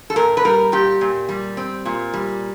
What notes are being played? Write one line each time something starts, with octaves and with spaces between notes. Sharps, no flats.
A4
A#2 A#4
B4
G3 A#4
A#2 G4
A#2
G3
C4
A#2
G3